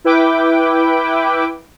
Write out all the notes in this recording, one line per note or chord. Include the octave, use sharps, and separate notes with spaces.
E4 B4 G5 D6